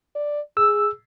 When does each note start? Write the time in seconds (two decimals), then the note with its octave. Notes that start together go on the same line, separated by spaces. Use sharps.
0.15 D5
0.57 G#4 E6